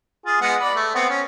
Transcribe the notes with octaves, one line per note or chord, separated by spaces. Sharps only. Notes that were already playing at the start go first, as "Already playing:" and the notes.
F4 G#4
G#3 B3 F#5
D5 B5
A3
B3 C4 F#5
C#4